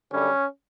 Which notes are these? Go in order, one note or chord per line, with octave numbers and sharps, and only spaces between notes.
F#2 D3 G3 C#4